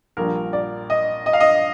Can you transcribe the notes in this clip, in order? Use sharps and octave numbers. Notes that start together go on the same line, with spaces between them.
A#1 A#2 G3 D4 A#4
D5
D#5
D#5
F5
D#5